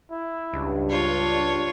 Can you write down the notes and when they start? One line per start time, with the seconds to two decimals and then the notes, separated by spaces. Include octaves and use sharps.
0.11 E4
0.53 C#2 G2
0.89 D4 F4 C#5